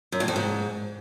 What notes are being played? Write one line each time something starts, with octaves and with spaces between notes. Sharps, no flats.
F#2
A2
F2
G#2